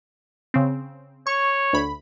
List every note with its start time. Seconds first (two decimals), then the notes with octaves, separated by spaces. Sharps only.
0.54 C#3 C4
1.27 C#5 C#6
1.73 D2 B5